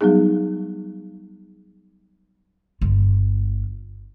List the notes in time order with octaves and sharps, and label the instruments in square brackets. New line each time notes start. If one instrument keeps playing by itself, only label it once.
[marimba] F#3 G3 B3 D#4 G#4
[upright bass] G1 F4